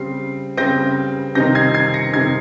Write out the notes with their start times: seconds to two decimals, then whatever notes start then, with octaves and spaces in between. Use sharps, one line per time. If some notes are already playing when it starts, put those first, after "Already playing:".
Already playing: C#3 G3 C4 C7
0.57 C#3 G3 C4 G6 A#6
1.35 C3 D#3 G3 C4 D#4 G6 A#6
1.55 G#6 C7
1.74 G#6 C7
1.94 A#6 C#7
2.13 C3 D#3 G3 C4 D#4 G#6 C7